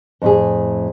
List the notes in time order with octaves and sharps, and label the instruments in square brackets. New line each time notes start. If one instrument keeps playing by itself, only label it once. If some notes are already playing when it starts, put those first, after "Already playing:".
[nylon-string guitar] F2 A2 G#4